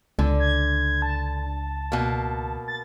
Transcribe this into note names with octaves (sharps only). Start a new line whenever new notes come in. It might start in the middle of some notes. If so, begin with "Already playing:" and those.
C#2 D3
G#6
A5
B2 A#3
A6